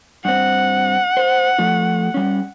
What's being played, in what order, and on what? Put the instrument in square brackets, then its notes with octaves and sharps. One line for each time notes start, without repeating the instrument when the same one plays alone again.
[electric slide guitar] G2 C4 [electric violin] F#5
[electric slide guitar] C5
F3 A3 F4
G3 C#4